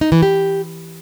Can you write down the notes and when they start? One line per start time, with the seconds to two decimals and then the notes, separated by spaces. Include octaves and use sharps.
0.01 D#4
0.12 E3
0.22 G4